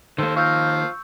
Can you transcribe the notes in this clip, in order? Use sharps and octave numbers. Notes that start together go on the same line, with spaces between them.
D#3 A#3 A4 C5
F3 F5 C#6 E6 G6